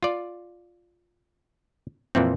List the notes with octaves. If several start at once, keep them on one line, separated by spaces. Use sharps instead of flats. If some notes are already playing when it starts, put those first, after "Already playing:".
F4 D5
F2 A#2 E3 C4